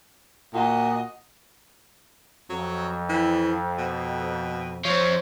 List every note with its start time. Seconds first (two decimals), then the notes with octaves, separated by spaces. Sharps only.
0.54 A#2 F#4 D#5
2.50 F2 F#3
3.09 E3
3.78 B2
4.85 F3 C4 C#5